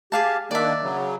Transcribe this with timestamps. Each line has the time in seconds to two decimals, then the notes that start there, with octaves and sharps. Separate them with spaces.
0.12 G4 G#4 F5 A5
0.51 D#3 A#3 D4 D5 E5
0.83 C#3 F#3